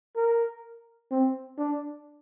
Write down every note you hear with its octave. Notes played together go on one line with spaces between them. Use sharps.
A#4
C4
D4